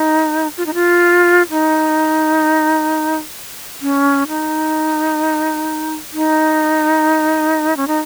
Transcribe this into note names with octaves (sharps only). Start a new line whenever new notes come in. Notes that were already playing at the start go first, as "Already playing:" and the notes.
Already playing: D#4
F4
D#4
F4
D#4
C#4
D#4
D#4
C#4
D#4